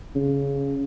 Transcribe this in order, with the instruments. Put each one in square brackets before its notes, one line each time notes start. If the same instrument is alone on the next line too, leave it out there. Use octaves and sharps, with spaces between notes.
[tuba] C#3